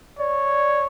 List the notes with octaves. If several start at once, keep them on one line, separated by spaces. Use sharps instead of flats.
C#5 D5